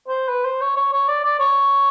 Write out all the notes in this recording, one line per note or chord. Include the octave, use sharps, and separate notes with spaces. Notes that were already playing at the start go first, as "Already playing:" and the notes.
C5
B4
C5
C#5
C#5
C#5
D5
D5
C#5